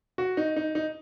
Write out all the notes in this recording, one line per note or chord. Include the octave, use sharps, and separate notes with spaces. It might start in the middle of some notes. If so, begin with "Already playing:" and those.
F#4
D#4
D#4
D#4